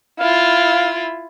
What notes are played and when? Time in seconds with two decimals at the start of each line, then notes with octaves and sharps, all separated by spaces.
0.20 E4 F4 F5